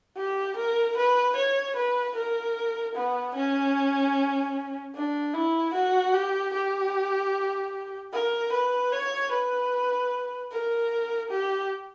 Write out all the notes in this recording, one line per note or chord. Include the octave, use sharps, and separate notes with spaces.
G4
A#4
B4
C#5
B4
A#4
B3
C#4
D4
E4
F#4
G4
G4
A#4
B4
C#5
B4
A#4
G4